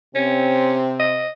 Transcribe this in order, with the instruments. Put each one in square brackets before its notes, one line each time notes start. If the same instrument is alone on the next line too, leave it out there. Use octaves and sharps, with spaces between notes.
[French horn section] C3 C4 [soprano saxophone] C#4
[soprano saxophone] D#5